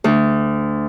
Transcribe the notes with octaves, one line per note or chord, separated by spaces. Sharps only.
D2